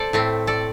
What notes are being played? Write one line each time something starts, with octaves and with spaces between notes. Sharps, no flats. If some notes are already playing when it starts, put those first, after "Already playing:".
Already playing: A4 C5 D5
A2 A3 C4
A4 D5